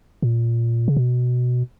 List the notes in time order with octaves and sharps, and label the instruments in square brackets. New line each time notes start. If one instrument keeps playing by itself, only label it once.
[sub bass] A#2
C#3
B2